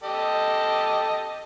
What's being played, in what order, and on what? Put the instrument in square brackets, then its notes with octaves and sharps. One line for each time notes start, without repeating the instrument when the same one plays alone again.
[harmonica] G4 A4 D#5